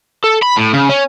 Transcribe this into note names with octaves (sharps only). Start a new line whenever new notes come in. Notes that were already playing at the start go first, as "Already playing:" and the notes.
A4
B5
A2
C#3
C#4